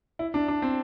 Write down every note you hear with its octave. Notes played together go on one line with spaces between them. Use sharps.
E4
D4
D4
C4